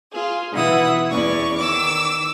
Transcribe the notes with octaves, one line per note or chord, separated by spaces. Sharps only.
F4 G#4
B2 E3 E4 F#5 D#6
E2 C#4 D5 C#6
D#3 D6 E6